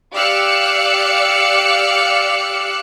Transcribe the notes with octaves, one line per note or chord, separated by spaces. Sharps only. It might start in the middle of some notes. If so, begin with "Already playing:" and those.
G4 D5 F5 E6 F#6 C#7